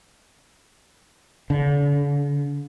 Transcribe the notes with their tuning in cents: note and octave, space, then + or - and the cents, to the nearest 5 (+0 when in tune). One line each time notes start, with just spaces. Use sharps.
D3 -40